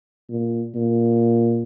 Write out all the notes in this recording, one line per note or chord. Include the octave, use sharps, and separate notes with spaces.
A#2
A#2